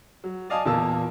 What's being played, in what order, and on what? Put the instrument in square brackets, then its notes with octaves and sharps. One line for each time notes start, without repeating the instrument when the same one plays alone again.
[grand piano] F#3
D5 D#5 F5 G#5 A5 D#6
E2 A#2 A#3 A5 E6